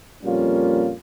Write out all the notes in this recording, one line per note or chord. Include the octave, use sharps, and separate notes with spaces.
F2 A#2 G3 A#3 C#4 F4